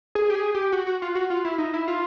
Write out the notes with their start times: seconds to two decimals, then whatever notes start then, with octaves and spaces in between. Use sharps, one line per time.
0.15 G#4
0.30 G4
0.35 G#4
0.54 G4
0.72 F#4
0.87 F#4
1.02 F4
1.15 F#4
1.30 F4
1.45 E4
1.58 D#4
1.74 E4
1.88 F4